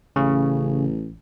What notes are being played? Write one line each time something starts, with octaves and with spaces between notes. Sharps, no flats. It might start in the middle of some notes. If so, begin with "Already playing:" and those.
A1 C#3